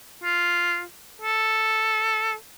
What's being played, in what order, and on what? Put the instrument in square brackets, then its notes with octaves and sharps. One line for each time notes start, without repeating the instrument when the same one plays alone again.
[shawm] F4
A4